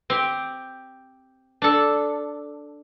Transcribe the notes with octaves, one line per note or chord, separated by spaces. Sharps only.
C4 G4
D4 A4